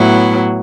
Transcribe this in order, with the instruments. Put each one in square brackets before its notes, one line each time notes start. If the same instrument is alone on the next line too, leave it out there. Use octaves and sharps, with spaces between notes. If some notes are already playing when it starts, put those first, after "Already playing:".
Already playing: [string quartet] A2 F#3 B3 E4